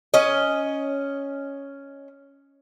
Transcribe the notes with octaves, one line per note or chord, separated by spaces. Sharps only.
C#4 D#5